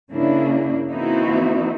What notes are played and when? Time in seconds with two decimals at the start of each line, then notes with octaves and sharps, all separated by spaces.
0.11 C#3 A#3 D4 E4
0.91 E3 A#3 C4 D#4 E4 F#4